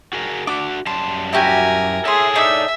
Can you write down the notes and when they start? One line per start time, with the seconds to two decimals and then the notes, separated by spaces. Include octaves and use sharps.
0.13 F#4 G#4 A#4
0.47 D4 F#4 D6
0.87 F#2 G3 A5 C6
1.33 E4 F#4 G4 A#4 G#5
2.05 G#4 A4 C#5 E5 C6
2.35 D4 D#4 D5 E5